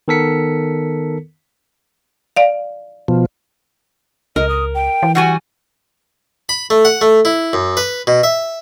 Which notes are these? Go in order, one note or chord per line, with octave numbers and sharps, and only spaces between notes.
D#3 B3 A4 A#4 B6 C#7
D5 F5
B2 F3
C#2 A#4 D#5
D#6
G5
E3
G3 F#4 F#5 G#5
B5
A3
F#5
A3
E4
F#2
B4
B2
E5